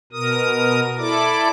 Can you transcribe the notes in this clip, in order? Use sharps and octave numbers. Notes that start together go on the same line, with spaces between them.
B2 A#4 D#6
E4 A4 D5 D6